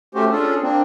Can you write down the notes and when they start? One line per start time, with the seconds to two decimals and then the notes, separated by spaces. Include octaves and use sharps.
0.15 A3 C#4 F#4 G4 C5
0.31 C#4 D4 F4 G#4 A4
0.62 A#3 C4 D4